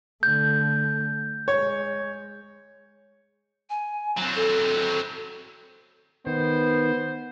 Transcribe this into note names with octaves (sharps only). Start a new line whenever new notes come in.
D3 A3 G6
G#3 C#5
G#5
F#3 C4
A4
D#3 B3 C5